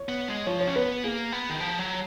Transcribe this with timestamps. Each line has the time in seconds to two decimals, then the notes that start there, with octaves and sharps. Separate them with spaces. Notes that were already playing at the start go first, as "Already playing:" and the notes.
Already playing: C#5
0.09 B3
0.28 G#3
0.46 F3 C#5
0.60 C#5
0.68 C#4
0.76 B3 B4
1.03 A#3 G#4
1.32 B3
1.50 D#3
1.60 F3
1.79 F#3